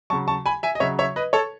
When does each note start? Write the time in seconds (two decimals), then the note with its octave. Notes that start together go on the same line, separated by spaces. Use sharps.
0.10 C#3 F#3 A5 C#6
0.28 A5 C#6
0.46 G#5 B5
0.63 E5 G#5
0.75 D#5
0.80 C#3 F#3 C#5 E5
0.99 C#5 E5
1.16 B4 D#5
1.33 A4 C#5